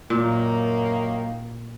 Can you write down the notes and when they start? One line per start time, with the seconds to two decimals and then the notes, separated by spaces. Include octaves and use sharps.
0.10 F#2 A#2 D#3 A#3